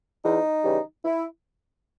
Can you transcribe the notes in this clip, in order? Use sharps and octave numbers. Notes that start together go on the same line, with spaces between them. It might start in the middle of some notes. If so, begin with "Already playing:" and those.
E2 D#4
C#3 E3 G3
E4